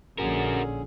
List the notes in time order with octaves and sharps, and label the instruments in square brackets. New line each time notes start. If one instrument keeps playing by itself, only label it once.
[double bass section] A#1 [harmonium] D3 C#4 G#4 [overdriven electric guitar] F#4 A#4